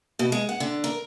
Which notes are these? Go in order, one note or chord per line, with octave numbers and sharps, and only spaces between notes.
B2
G#3
F#5
D3
A#4